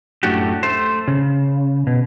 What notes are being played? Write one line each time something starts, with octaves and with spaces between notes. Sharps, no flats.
F#2 A2 A3 D4 F#4 G4
A3 C5
C#3
B2